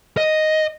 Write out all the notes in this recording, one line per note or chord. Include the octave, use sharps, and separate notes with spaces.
D#5